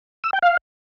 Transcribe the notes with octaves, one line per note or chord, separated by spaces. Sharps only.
E6
G5
F5